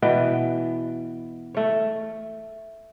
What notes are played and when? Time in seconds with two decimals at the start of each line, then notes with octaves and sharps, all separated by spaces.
0.02 B2 E3 B3 G5
1.54 A3 C#5